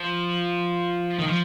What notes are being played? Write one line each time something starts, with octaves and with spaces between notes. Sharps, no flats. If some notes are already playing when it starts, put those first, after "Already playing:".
Already playing: F3
D#3
F3